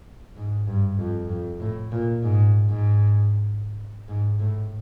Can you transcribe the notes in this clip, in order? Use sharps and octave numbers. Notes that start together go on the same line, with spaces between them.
G#2
G2
F2
F2
A2
A#2
G#2
G#2
G#2
A2